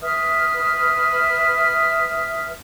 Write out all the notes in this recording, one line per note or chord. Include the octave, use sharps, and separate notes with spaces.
B4 E5 D#6 F6